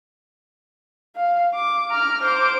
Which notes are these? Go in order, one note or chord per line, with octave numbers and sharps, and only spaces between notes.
F5
D6
A#5 F6
C5 D6